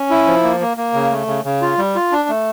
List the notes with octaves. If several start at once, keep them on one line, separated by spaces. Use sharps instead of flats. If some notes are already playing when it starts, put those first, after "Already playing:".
Already playing: C#4
E4
F3
A#3
A#3
A#3
C#3
A3
C#3
C#3
F4
G3
F4
D4
A3